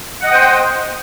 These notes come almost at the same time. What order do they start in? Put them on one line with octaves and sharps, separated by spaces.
F#5 D#5 D#6 G5 C5